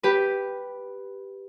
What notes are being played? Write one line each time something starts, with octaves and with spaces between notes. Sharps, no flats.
G4 B4